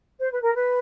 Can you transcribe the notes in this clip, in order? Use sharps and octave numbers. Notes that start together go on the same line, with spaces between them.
C5
B4
A#4
B4